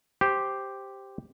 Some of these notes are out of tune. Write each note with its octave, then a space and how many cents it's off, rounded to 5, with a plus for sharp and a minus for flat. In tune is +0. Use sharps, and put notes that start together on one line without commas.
G4 +0 C5 +0